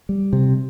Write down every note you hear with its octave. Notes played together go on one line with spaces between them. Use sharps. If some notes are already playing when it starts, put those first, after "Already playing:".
G3
C3